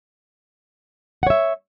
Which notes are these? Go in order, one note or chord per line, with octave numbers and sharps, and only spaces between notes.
C#5 E5 F#5